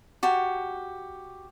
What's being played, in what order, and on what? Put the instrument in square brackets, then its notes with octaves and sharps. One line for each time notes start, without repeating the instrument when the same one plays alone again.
[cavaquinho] F#4 G4 A5